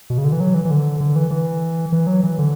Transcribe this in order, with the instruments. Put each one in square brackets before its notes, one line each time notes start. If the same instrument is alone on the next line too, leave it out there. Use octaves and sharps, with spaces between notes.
[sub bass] B2
C#3
D3
E3
F#3
E3
E3
D3
D3
E3
E3
E3
F#3
E3
D3